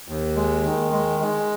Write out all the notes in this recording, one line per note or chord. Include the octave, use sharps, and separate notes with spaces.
D#2
G#3
D#3
G#3
G#3